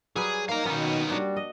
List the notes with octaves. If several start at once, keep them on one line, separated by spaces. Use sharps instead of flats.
F#3 G3 G#4 B4
A#3 D#4 F5 A#5
B2 D#3 B3 C#4 D#4
G3 D4 F#4
D#5